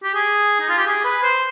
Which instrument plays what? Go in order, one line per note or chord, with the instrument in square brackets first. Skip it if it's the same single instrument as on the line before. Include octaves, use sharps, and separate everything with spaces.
[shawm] G4
G#4
D#4
F4
G4
G#4
B4
C5